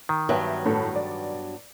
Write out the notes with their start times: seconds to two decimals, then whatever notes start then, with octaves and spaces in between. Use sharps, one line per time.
0.09 D#3
0.29 G2 F#3 B3 C#5 E5 G5
0.66 A2 A4
0.96 D5